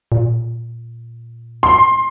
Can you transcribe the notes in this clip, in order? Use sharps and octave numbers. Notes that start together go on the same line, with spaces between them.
A#2
C6